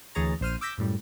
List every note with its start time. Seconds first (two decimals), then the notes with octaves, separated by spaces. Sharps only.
0.15 D2 E3 G#4 C#5 A#5 A6
0.41 A#1 C5 F6 D#7
0.61 D6 E6 G6 A#6 B6
0.78 F#2 A2 G3